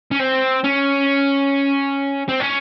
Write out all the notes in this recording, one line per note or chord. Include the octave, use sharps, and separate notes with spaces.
C#4
C4
C#4
C4
C#4